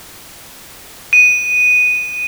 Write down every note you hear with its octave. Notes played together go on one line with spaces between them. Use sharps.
D#7